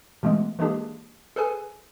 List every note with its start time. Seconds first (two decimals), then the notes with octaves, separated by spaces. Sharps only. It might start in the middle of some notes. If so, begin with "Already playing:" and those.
0.23 B2 E3 G#3 A3 B3
0.59 E3 G#3 A#3 D4 G4 G#4
1.36 G#4 A4 B4 G#5